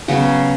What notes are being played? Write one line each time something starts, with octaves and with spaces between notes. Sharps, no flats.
C#3 F#3 B3 F#4